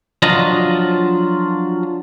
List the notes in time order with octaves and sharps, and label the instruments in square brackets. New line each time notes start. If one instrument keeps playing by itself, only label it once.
[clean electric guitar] F3 F#3 D4 F4 D#5